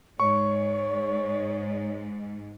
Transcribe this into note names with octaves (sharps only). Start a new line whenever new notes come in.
G#2 C#5 C#6